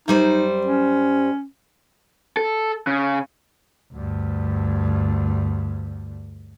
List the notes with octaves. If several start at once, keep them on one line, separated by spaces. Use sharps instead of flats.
F#2 G3 D#4 C5
C#4
A4
C#3
D2 G2